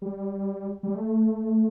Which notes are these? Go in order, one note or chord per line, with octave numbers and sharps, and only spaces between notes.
G3
G3
A3